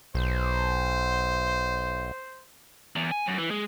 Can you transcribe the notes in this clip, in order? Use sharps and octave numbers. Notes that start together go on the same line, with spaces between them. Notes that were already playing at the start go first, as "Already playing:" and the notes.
B1 C5
E2
G#5
F#2
E3
G#3